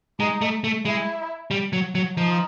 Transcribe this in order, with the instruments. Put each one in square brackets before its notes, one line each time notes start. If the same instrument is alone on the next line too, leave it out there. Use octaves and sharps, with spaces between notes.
[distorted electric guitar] G#3 [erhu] D#4
[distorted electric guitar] A3
A3
[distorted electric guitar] G#3 [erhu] E4
[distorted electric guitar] G3
F#3
F#3
[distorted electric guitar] F3 [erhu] D#4